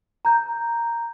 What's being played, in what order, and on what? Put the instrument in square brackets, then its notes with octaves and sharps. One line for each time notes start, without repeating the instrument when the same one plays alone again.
[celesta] A#5 G6